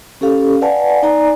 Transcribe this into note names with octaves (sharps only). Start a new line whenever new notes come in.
C#4 G4 A4 F5
B4 D5 F5 F#5 G#5 A5
D#4 D5 G#5 A#5